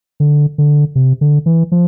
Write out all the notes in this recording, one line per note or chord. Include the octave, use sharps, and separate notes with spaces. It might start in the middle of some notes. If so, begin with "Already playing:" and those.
D3
D3
C3
D3
E3
F3